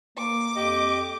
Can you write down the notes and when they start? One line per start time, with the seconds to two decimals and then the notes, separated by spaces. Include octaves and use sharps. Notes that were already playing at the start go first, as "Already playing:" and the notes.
0.18 A#3 D6
0.56 F2 G4 D#5